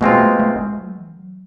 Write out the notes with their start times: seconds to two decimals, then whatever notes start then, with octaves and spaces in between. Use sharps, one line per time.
0.01 B2 G#3 A3 C4 F4
0.20 A3
0.40 A3
0.59 G#3
0.79 F#3
0.98 E3
1.17 F#3